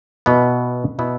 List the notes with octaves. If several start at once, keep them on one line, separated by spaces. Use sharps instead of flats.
B2 B3 E4
B2 B3 E4